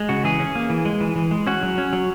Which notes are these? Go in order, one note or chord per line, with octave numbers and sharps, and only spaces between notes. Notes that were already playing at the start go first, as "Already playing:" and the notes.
Already playing: G#3
C#3 F#4
E3 G#4
C#4
A#3
E3
G#3
E3
E3
G#3
C#4 F#4
F#3
C#4
F#3